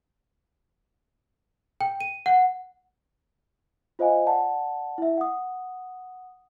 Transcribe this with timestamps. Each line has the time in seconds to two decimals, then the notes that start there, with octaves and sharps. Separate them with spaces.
1.81 G5
2.01 D#7
2.26 F#5
3.99 F4 C5 D#5 F5 G#5
4.27 D5 F#5 A5
4.98 E4 E5
5.18 F#5 D#6